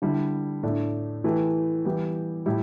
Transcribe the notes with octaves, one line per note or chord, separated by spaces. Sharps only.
D3 G3 E4
A2 A3 D4
E3 A3 G4
E3 G3 B3 G4
A2 G3 E4 G4